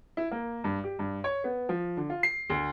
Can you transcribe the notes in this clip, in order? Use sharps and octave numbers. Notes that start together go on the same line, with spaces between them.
E4
A#3
G2
G4
G2
C#5
B3
F3
D3
F4
C7
D2